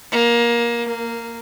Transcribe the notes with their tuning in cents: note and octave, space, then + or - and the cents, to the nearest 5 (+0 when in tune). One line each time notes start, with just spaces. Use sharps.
A#3 +20
A#3 -10